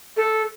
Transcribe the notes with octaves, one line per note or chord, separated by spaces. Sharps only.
A4